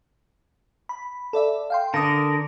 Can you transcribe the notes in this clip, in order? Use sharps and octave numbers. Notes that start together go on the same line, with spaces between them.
B5
A4 D5 E5
F5 G5 C6
D3 A#4 A5 D#6